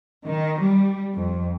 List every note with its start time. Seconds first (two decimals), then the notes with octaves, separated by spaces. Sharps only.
0.24 D#3
0.61 G3
1.14 F2